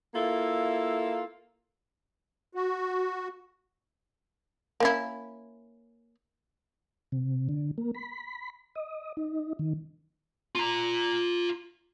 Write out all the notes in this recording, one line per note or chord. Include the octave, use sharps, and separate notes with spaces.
A#3 E4 F4 A4
F#4
A#3 C#4 E4
C3
D3
A#3
B5
D#5
D#4
D#3
F4 A#5